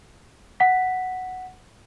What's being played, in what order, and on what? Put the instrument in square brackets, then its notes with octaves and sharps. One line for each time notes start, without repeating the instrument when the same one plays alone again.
[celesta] F#5 B6